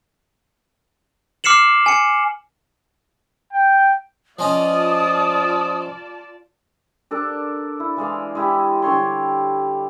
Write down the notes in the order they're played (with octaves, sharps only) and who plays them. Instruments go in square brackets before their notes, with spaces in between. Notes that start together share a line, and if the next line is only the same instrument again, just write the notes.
[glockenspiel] D6 F6 C7 C#7 E7 F#7
G#5 C#7
[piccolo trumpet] G5
[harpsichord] F3 C#4 D#5 [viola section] F4 D5 A5 [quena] D#6
[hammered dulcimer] D4 A4 A#4 D5
E4
E3 G#3 D5 F5
G#3 E4 G4
D3 G3 C#5 C6